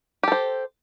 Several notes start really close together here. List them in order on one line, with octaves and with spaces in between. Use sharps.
G4 A4 C5